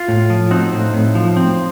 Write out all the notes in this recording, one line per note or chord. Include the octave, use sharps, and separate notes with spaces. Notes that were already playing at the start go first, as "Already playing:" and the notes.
Already playing: F4
A2
F3
C4 D#4 F#4
A2
A2
F3
C4